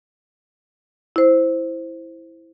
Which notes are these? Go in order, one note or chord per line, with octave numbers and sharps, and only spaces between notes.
E4 C5